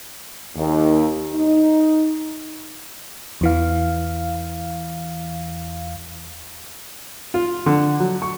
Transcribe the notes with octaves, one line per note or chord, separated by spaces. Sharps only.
D#2
D#4
E2 E3 F5
F4
D3
F#3
C#6